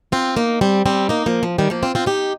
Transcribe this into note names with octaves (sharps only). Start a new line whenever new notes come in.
C4 F4
A#3 D#4
G3 C4
G3 C4
A#3 D#4
F3 A#3
F3
D#3 G3
F3 A#3
C4 F4
C4 F4
D#4 G4